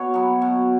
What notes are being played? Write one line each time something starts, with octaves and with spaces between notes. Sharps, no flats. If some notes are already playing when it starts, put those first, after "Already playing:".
Already playing: B2 C#5
F#3 B3
B2